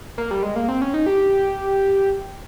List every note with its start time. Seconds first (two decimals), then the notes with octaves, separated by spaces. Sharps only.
0.18 A#3
0.31 G3
0.43 G#3
0.56 A#3
0.68 C4
0.82 C#4
0.94 D#4
1.06 G4